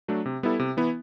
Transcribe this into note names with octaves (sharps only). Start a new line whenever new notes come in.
F#3 A3 D4
C3
G3 B3 E4 A4
C3
E3 B3 E4